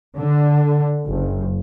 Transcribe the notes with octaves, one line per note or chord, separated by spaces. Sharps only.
D3
F#1